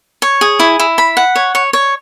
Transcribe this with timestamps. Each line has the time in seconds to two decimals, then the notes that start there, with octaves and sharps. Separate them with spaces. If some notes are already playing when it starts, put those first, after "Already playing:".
0.22 C#5
0.41 G#4
0.60 E4
0.80 E4
0.98 B5
1.17 F#5
1.36 C#5
1.55 C#5
1.73 C#5